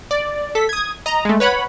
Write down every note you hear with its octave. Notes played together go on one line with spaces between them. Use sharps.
D5
A4 B6
D#6 G#6
D#5 A#5
G#3 A3
B4 C#5 F#5 B5